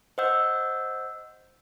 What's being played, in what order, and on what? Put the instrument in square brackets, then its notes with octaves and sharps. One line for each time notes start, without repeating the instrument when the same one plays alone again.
[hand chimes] C5 D#5 F#5 E6 G6